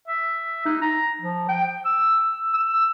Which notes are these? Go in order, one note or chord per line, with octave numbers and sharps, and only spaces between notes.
E5
D#4
A#5
F3
G5
E6
E6